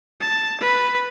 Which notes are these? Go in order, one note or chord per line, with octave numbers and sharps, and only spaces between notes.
A5
B4